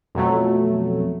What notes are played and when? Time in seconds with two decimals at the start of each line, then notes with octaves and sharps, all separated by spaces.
0.15 F2 B2 F#3 A3